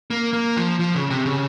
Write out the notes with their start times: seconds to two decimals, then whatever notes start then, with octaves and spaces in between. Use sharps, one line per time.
0.10 A#3
0.33 A#3
0.57 F3
0.79 F3
0.95 C#3
1.10 C3
1.26 C#3